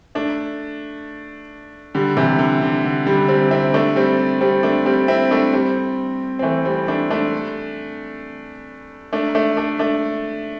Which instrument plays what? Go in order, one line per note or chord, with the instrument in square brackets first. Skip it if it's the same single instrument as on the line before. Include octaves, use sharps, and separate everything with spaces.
[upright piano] A3 D4
D3 G3
C3 E3
D3
D3
D3
D3 G3
G3 C4
C4 E4
A3 D4
G3 C4
G3 C4
A3 D4
G3 C4
C4 E4
A3 D4
G3 C4
C4
E3 A3
G3 C4
A3 D4
A3 D4
A3 D4
A3 D4
A3 D4
A3 D4